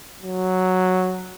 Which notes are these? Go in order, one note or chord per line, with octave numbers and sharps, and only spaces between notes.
F#3